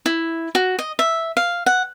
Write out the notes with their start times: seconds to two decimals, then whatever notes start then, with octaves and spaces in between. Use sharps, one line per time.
0.06 E4
0.55 F#4
0.79 D#5
0.99 E5
1.37 F5
1.66 F#5